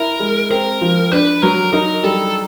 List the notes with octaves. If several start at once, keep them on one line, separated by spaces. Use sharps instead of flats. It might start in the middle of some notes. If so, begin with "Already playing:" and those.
Already playing: E4 A#4
G#3
C4 A#4
F3
D4 B4
F#3 A#4
D#4 A#4
G3 A4